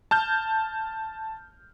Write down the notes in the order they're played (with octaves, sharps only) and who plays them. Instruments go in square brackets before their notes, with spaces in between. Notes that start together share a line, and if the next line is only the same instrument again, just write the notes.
[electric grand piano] A5 F6 G6